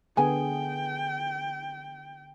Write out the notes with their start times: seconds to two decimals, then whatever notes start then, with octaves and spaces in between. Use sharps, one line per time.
0.17 D3 B3 G#4 G5 G#5